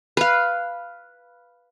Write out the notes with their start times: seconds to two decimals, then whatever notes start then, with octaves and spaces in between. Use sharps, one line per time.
0.17 B4 F5